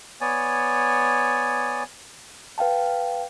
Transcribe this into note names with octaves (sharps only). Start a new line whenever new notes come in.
B3 C#5 D5 G#5
B4 F5 G5 A5